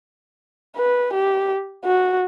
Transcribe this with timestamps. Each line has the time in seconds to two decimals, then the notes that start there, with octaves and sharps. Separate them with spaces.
0.76 B4
1.13 G4
1.84 F#4